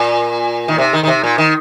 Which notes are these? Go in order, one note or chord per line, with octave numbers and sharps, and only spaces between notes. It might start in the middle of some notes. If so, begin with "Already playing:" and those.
Already playing: A#2
D#3
C3
D#3
D#3
C3
A#2
D#3